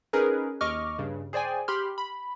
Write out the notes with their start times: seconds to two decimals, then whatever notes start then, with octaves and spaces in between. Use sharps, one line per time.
0.13 C#4 D#4 G#4 A#4 B4
0.61 D#2 D#5 C#6 D6 F6
0.99 G2 C#3
1.33 G#4 C5 D5 G5 G#5
1.68 G4 B5 C6 F6
1.98 B5